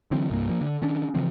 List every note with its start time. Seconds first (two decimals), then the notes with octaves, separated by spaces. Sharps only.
0.11 D3 E3 F#3 C4
0.30 C2 G2 A#3
0.49 F3 A#3
0.61 D3
0.82 D#3 C#4 D4
1.15 C#3 E3 F3 C4